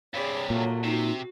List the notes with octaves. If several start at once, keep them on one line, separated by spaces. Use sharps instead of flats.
G2 C3 G#4 C#5 D5 B5
A#2 F#3 A3 A#3
C3 D#4 F#4